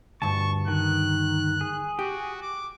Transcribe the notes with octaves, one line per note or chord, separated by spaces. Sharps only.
D2 G2 A5 C#6
D#3 F#6
G#4
F#4 G4
D6